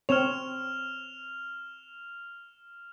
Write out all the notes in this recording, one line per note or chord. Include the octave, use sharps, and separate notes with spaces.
C4 C#5 F6 E7 F7